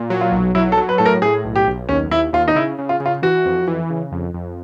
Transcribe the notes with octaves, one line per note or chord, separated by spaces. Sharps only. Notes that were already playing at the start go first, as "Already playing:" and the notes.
Already playing: A#2
F#3
F4
B1
F#3 E4
A4
F#3
B4
A2 A4
A#4
A2 G#4
B1
G4
B1
D#2 C#4
D#2 E4
D#2 F4
D#4
C#3 E4
C#3
F4
C#3
F4
E3 F#4
F2
E3
C#3
F2
F2